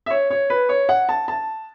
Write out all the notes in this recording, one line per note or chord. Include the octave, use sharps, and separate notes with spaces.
E5
C#5
C#5
B4
C#5
F#5
A5
A5